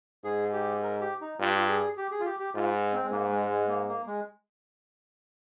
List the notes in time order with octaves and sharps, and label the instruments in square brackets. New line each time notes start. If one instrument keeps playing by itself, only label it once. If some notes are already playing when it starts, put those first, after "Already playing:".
[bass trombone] G#2 [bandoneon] G#4
[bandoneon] G4
A#4
G4
D#4
[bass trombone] G2 [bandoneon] F4
[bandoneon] G4
F4
G#4
G4
G#4
F4
G4
G4
[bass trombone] G#2 [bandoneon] F4
[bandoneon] C4
G#3
[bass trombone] G#2 [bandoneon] A#3
[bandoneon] G#3
G#3
A#3
A#3
G#3